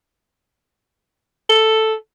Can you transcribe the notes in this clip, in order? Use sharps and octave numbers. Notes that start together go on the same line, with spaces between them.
A4